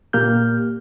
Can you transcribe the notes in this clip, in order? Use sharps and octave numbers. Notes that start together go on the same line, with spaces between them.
A#2 A#3 G4 F6 G6